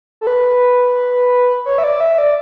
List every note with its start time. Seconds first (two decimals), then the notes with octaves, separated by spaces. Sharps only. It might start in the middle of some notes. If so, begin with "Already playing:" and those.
0.21 A4
0.27 B4
1.66 C#5
1.78 E5
1.84 D5
2.00 E5
2.18 D5